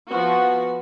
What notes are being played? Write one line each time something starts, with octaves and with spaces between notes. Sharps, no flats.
F3 B3 F#4